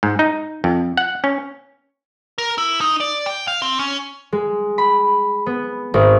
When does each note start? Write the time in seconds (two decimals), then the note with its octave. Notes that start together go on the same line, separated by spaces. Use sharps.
0.03 G#2
0.19 D#4
0.64 F2
0.97 F#5
1.24 C#4
2.38 A#4
2.58 E4
2.81 D#4
3.00 D5
3.26 G5
3.48 F5
3.62 C4
3.79 C#4
4.32 G#3
4.78 B5
5.46 B3
5.94 G#1